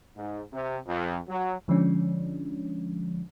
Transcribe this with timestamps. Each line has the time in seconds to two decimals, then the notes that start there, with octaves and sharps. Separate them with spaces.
0.16 G#2
0.53 C3
0.87 F2
1.29 F#3
1.68 D3 F3 G#3 C#4 D4